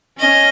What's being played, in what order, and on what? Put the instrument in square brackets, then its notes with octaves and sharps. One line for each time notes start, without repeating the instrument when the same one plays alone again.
[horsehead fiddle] C#4 [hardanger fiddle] D#5